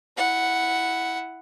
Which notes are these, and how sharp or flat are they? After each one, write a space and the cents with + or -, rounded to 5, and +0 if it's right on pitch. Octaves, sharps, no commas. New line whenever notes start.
E4 +0 F#5 +0